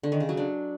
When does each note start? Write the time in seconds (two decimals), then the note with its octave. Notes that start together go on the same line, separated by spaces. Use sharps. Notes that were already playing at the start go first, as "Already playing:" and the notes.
0.03 D3
0.12 D#3
0.20 C#3
0.29 F#3
0.37 D4